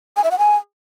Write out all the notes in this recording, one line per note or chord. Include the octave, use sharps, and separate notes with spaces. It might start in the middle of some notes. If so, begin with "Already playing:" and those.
G#5
E5
F#5
G#5